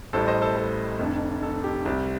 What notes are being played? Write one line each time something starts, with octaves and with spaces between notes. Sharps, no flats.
A1 A2 G3 A4 C5
C5 D#5
A4 C5
A4
F1 F2 D3
A4
G4
C2 C3 G3 G4